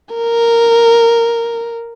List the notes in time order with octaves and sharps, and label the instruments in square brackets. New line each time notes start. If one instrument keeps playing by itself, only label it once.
[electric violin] A#4